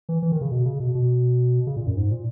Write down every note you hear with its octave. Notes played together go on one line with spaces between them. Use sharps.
E3
E3
D#3
C#3
B2
C#3
B2
B2
C#3
A#2
F#2
G#2
A#2